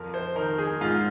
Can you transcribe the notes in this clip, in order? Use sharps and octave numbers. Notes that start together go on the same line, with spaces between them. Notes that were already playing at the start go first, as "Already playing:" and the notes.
Already playing: F2 A#4
C5
D#3 A#4
G#4
G#2 F4